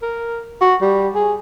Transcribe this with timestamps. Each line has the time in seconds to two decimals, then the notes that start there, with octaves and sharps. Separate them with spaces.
0.02 A#4
0.61 F#4
0.81 G3
1.15 G#4